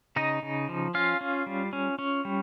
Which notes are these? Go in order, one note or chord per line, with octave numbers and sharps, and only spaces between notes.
C#3 D#4 D#5
C#3
F3
C#4 F4 F5
C#4
G3
C#4
C#4
G3